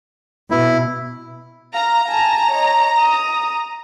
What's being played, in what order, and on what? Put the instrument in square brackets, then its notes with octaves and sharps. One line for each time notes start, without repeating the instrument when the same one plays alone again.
[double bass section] B2 [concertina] E4
[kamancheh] F5 [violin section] A#5
[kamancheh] G#5 A5
C#5 D#5
D#6